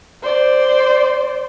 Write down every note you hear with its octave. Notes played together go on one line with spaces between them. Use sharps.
C5 D5